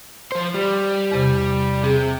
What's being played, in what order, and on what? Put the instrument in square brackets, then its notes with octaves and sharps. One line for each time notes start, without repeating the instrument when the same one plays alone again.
[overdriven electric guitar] F3 C5
G3
[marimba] E2 C3
[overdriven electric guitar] C3 [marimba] G#4